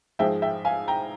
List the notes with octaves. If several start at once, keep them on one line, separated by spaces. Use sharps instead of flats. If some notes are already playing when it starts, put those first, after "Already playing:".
G#2 F3 G#3 E5 G5
E5 G5
F5 G#5
G5 A#5